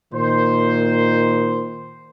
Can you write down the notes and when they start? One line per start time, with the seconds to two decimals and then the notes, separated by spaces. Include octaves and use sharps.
0.13 A#2 D#3 C5